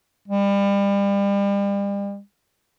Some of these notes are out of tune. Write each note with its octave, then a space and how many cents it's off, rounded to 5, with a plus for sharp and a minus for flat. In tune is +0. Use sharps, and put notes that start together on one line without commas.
G3 +35